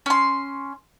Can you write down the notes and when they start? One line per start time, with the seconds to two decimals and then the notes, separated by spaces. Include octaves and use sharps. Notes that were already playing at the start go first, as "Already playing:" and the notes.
0.06 C#4 C6